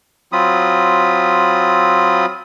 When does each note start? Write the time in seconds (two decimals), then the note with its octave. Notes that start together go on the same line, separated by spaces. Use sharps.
0.32 F#3 C4 F4 B5 D#6